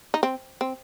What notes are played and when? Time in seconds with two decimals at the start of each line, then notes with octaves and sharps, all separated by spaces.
0.14 D#4
0.23 C4
0.61 C4